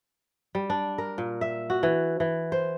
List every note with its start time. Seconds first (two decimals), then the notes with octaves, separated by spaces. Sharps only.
0.55 G3
0.70 D4
0.98 A#4
1.18 A#2
1.41 E5
1.70 F#4
1.83 E3
2.20 E3
2.52 C5